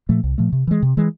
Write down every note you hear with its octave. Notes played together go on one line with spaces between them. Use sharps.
A#2 F3 A3
C2
A#2 F3 A3
C3
E3 G#3
C3
E3 G#3